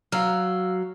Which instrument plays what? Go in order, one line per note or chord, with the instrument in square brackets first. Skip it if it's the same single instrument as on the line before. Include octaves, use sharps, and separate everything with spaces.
[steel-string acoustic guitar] F#3 [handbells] F5 E6 F6